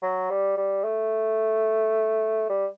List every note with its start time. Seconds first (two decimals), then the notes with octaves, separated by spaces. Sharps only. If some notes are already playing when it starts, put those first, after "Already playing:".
0.03 F#3
0.30 G3
0.57 G3
0.85 A3
2.49 G3